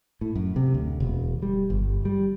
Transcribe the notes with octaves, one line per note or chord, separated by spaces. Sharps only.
A2
F#2
C3
D2
E1
G3
G1
G3